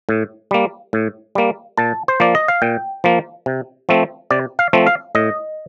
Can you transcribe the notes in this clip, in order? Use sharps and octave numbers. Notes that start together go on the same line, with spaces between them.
A2
G3 A#3
A2
G3 A#3
A#2 A5
C5
F3 A#3 D5
D#5
F5
A#2 G5
F3 A#3
C3
F3 A3 C4
C3 D5
F5
F3 A3 C4
F5
A2 D#5